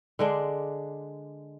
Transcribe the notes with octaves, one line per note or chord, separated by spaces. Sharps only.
D3 G#3 D4